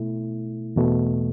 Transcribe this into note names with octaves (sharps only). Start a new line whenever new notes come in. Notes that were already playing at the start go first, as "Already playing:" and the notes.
Already playing: B2 A3 E4
E2 B2 A3